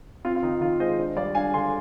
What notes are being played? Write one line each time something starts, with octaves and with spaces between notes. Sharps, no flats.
C4 F4
F4
D#3 D#4
D#3 F4
G#3 C5 D#5
D4
G3 D5 F5
D4 F5 G#5
D3 G#5 C6